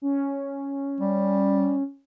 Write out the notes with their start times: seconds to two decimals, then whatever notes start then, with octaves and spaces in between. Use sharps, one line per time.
0.02 C#4
1.00 G3